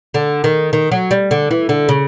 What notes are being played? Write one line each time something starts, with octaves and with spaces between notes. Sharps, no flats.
D3
D#3
D#3
F#3
G3
D3
E3
D3
C#3